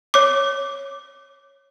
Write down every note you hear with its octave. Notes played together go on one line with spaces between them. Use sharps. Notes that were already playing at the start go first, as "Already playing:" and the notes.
C#5 D6